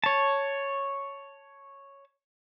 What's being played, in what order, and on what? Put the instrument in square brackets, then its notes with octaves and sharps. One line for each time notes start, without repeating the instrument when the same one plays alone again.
[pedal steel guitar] C#5 A5